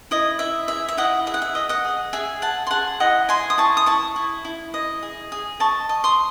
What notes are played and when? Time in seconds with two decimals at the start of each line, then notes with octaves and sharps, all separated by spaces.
0.11 E4 D#5
0.39 E4 E5
0.68 G#4 E5
0.88 E5
0.97 E4 D#5 F#5
1.27 G#4 E5
1.34 F#5
1.42 E5
1.55 D#5
1.69 D#5 F#5
1.85 G#4
2.13 G#4 E5 G#5
2.42 G#4 F#5 A5
2.67 C6
2.71 G#4 F#5 A5
3.00 E4 D#5 F#5
3.29 D#5 G#5 C6
3.50 D#6
3.58 E4 A5 C#6
3.77 D#6
3.86 E4 A5 C#6
4.16 E4
4.45 E4
4.74 D#5
5.03 G#4
5.32 G#4
5.60 D#5 A5 C#6
5.89 D#5
6.04 C6 D#6